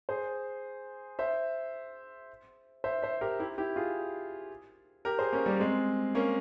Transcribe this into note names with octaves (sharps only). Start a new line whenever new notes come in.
G#4 C5
C5 E5
C5 E5
C5 E5
G4 A#4
E4 G4
E4 G4
F4 G#4
G4 A#4
G#4 C5
A#3 C#4
G3 A#3
G#3 C4
A#3 C#4